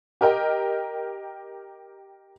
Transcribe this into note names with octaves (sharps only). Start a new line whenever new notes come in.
G4 A#4 D#5 G5